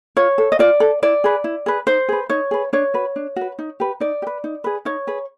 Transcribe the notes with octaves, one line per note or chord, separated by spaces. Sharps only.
F4 C#5
A4
D#5
F4 D5
A4
E4 D5
G#4 B4
E4
G#4 B4
D#4 C5
G#4 B4
D#4 C#5
G#4 B4
D4 C#5
F#4 B4
D4
F#4 B4
D#4
G4 B4
D#4 D5
G4
B4
D#4
G#4 B4
D#4 C#5
G#4 B4